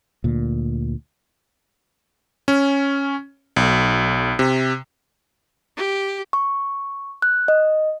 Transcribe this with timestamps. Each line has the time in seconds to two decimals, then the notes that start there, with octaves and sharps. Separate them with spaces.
0.24 D2 A#2
2.48 C#4
3.56 B1
4.39 C3
5.77 G4
6.33 C#6
7.22 F#6
7.48 D#5